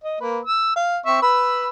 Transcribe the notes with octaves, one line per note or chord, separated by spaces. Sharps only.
D#5
A#3 B4
E6
F5
C4 E5 C#6
B4 B5 E6